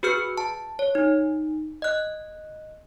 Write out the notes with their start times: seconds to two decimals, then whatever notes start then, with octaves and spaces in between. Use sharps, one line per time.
0.03 F#4 G#4 B4 F6 G6 C#7
0.37 A5
0.79 C#5
0.95 D#4
1.82 D#5 F#6